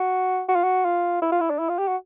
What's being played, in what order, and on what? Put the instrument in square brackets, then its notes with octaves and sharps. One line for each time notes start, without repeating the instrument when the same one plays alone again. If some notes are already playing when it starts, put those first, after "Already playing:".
Already playing: [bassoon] F#4
F#4
F4
F#4
F4
E4
F4
E4
D4
E4
F4
G4
F#4